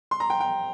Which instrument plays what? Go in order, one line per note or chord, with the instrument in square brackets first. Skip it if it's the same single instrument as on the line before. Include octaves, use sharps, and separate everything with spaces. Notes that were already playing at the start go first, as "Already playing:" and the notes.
[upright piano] C6
A#5
G5
G5